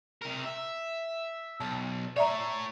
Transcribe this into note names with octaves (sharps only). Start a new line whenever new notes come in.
C3 A#4
E5
B1 A5
A2 C#5 D5 E5 A#5